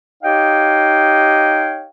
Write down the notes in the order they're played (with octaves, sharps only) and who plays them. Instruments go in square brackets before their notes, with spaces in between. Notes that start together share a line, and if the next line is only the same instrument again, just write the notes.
[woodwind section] D#4 G4 C#5 D#5 F5 G5